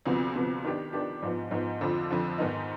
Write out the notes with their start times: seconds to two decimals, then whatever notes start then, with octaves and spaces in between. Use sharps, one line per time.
0.06 D2 C3 F3 B3
0.35 D2 C3 F3 B3
0.64 D#3 B3 D4 G4
0.93 D#3 B3 D4 G4
1.22 G#2 F3 B3
1.51 G#2 F3 B3
1.81 F2 D3 F3
2.10 F2 D3 F3
2.38 G#2 D#3 B3 D#4